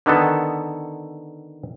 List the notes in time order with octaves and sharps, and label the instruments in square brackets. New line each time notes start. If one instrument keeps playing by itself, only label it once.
[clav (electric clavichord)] D3 D#3 B3 A4